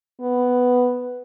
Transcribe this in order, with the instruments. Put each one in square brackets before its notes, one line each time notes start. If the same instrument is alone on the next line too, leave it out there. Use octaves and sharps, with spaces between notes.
[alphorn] B3